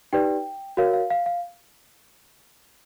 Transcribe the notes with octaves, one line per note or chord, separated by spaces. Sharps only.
D#4 G4 B4 D5 G5
F#4 A#4 C#5 F5
F5
F5
F5